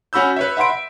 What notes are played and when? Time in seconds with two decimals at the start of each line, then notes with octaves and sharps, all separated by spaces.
0.13 C#4 F#4 B5 E6 G6
0.36 B4 C#5 E5
0.57 E5 F#5 B5 C6 D7
0.70 E5